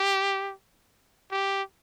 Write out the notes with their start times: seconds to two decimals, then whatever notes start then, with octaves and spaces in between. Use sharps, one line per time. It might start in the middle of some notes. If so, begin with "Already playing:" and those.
Already playing: G4
1.32 G4